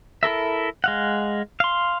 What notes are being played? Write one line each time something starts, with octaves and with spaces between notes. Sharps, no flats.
E4 A4 A#4 E5
G#3 F5 F#5
F5 C6